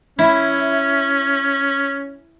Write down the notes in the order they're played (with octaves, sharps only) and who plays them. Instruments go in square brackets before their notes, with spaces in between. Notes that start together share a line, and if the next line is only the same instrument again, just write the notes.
[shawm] C#4 [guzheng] E4